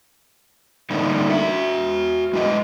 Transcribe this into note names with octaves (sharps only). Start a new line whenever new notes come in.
D3 G3 A3 A#3 D4 D#4
F#4 E5
G#3 E4 D#5